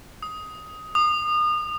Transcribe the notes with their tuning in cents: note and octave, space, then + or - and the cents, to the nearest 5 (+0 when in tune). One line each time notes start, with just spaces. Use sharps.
D#6 +10
D#6 -35